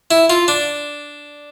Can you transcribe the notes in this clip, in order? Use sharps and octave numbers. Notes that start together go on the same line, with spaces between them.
E4
F4
D4